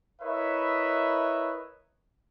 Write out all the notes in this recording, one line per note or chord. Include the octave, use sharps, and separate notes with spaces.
E4 A#4 B4 C#5 D#5 E5